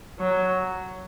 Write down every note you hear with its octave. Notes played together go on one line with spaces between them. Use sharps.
F#3